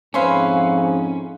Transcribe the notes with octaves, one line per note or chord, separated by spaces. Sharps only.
F2 G#2 C#4 B4 C5 E5 F5 G#5